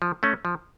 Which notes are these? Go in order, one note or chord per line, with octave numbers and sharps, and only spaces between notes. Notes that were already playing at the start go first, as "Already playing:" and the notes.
F3
A3 C#4
F3